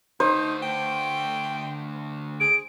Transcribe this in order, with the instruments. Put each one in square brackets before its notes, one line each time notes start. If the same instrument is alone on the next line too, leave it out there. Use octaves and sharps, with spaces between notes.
[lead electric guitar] D3 A3 [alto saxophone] D#4 [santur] C5
[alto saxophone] G5
[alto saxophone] G#4 [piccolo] D7